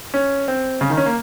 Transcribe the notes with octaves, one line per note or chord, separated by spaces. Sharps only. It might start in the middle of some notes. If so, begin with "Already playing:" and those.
C#4
C4
C#3
D#3
C#4
A#3